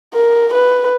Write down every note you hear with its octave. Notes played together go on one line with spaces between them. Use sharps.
A#4
B4